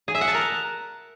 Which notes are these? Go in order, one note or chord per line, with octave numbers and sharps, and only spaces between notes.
G#4
E5
F#5
A5
A#4